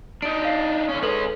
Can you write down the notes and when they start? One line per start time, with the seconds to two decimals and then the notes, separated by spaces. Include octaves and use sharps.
0.22 D4 D#4 D7
0.45 F5 C7
0.89 D3 C#4
1.02 G#3 C#4 A4 B4 F#7